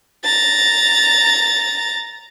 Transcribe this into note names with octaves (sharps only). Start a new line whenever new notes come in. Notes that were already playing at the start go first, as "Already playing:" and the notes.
A#5 A6